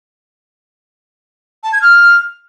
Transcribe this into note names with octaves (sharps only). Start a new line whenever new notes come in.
A5
G#6
F6